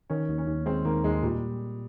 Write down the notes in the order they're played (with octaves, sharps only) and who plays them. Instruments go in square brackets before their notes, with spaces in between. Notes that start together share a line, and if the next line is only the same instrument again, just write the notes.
[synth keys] D#3 [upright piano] C#4
[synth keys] D#2
[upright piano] C#4
[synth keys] D#2
[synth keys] G#3 [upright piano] C4
[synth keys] D#3 [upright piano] A#3
[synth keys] D#2 [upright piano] G#3
[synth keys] A#2 [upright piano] G3